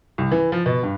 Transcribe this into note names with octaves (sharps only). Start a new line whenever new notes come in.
C2
E3
F3
B2
G2